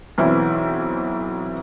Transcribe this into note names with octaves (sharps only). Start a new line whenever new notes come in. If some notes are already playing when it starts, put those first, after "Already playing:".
B1 E3 C4 E4